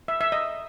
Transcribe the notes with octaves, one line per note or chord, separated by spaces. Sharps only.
E5
E5
D#5